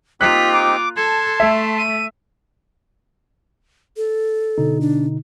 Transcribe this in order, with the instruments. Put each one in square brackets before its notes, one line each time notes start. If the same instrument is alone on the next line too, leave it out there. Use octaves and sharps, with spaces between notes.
[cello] A#3 F4 [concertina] C4 D#4 G4 [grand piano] F#6 [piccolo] B6
[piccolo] D6
[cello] A4 [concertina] A5 C6 [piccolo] G#6
[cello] A3 [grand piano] E5
[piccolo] D#7
[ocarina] A4
[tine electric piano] B2 D3 D#4
[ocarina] D4